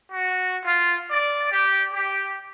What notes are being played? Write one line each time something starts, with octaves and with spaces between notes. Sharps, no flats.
F#4
F4
D5
G4
G4